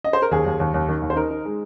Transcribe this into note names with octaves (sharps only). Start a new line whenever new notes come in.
D#5
C5
A#4
D#2 G#4
D#2
D#2
D#2
D#3
D#2
C5
D#4 A#4
D#4
G#3